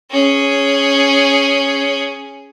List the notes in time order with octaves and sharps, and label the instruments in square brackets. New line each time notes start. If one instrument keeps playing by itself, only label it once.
[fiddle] C#4 G#4